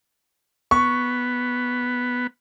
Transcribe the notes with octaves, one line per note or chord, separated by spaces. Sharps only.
B3 C#6